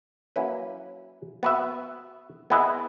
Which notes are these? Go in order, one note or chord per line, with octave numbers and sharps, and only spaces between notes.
F#3 A#3 C#4 E4 B4
B3 F#4 B4 E5
B3 E4 G#4 B4 D#5